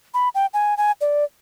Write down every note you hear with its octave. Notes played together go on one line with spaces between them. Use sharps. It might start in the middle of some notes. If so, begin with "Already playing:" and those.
B5
G5
G#5
G#5
D5